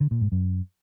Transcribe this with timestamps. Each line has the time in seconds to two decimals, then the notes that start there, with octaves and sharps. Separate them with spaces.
0.01 D3
0.11 A#2
0.21 G#2
0.32 F#2